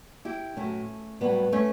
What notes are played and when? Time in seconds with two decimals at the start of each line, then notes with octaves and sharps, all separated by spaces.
0.25 E4 G4
0.57 A2 F#3 A3 C#4
1.21 A2 F#3 G3 B3
1.52 A3 C#4